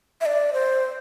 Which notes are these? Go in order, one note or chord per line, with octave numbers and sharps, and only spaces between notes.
E5
D5
C5